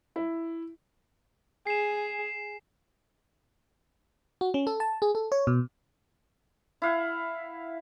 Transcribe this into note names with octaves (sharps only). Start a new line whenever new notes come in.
E4
G#4 C7 E7
F#4
C#4
A4
A5
G#4
A4
C#5
B2
E4 F5 F#5